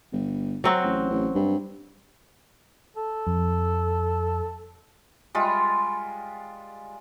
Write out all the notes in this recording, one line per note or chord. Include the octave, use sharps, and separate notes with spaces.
G1
F#3 C4 F#4
A1
A1
G2
A4
F2
G3 G#3 F4